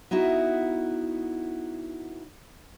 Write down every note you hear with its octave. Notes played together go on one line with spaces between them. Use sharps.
B3 D#4 E4 F#4